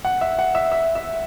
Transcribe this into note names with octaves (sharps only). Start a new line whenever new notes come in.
F#5
E5
F#5
E5
E5
E5